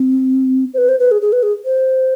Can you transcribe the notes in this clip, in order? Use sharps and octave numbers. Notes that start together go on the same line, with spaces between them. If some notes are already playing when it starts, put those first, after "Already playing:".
Already playing: C4
C5
B4
C5
B4
G#4
G#4
B4
G#4
C5